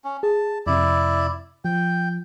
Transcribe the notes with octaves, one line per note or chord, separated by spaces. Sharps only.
C#4
G#4 A5
F2 C3 E4 D5
F3 G5